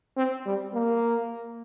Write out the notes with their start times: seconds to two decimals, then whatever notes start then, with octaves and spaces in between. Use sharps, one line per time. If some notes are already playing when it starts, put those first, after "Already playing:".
0.17 C4
0.46 G3
0.74 A#3